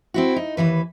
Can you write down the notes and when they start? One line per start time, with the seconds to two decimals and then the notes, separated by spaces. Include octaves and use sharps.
0.14 C4 E4 F#4
0.36 D#4
0.57 D#2 A#2 E3 B4